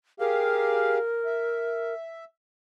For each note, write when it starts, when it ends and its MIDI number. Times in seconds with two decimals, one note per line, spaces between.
0.20 0.98 67
0.20 0.98 68
0.20 1.94 70
0.20 0.98 77
1.25 2.25 76